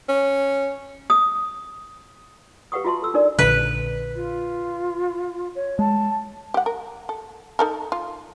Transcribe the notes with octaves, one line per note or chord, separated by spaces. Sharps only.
C#4
D#6
G4 B4 F5 F#5 C#6 D#6
F4 F#4 E5 A5 C6
A4 E6
D4 D#4 A#4 D5
A#1 A#2 D3 B4
F4
C#5
G#3 A5
G4 F#5
A#4
A4
D#4 A4 A#4
F4